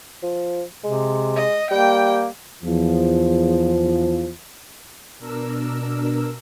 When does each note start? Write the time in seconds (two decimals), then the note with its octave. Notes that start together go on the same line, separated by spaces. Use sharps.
0.23 F3
0.84 C3 G#3
1.36 D#5
1.71 G3 A#3 G5
2.63 E2 F3
5.19 B2 D4 A#4 E6